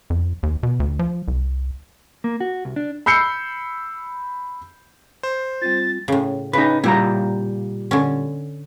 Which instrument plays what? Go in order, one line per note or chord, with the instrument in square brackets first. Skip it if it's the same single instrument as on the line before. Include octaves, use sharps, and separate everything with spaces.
[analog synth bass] F2
D#2
B2
D2
F3
C2
[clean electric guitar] A#3
F#4
C2
D4
[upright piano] B5 E6 G6 C7 C#7
[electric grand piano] C5
[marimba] G3 C4 F4 [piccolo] A6
[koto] A2 C#3
[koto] C#3 [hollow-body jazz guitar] D#4 B4
[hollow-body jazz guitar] A#2 G3 A#5 [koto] E4
[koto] D3 C#4